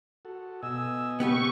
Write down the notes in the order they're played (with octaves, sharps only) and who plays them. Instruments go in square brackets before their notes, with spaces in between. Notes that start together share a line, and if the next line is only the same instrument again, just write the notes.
[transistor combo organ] F#4 A4
[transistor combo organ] B2 D#5 G#5 [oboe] E6
[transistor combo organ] C#3 [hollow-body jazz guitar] B3 G4 B4 [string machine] C#6